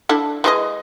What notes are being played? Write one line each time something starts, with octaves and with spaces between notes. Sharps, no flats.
D4 E4 A4
E3 G#3 D#5